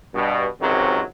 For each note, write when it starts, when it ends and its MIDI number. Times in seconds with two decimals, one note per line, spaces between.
0.14 0.46 43
0.14 0.46 47
0.60 1.02 32
0.60 1.02 37
0.60 1.02 48
0.60 1.02 51
0.60 1.02 54